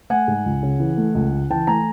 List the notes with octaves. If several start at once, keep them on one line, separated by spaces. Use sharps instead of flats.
A3 F#5 G#5
G#2
C#2
C#3
E3
A3
C#2
C#3
E3 G5 A5
A3 G#5 A#5